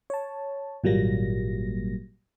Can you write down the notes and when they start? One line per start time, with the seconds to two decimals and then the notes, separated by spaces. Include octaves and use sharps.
0.10 C#5 A5
0.84 G#1 A#2 F#3 G3 A#3 A#6